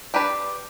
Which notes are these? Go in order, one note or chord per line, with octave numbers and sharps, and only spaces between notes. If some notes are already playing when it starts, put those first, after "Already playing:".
D4 G4 B4 D5